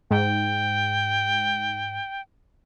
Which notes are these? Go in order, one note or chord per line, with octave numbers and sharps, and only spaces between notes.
G#2 G5